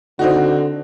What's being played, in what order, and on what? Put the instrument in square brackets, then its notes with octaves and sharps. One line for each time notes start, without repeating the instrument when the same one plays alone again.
[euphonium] D3 [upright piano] C4 D#4 F#4